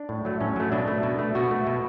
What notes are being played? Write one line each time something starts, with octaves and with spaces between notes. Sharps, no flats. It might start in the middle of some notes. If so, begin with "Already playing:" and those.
Already playing: D4
A2
F#3 A3
A2 C#4
F#3 A3
B2 D4
A3
B2
A3
B2 F#4
A3
B2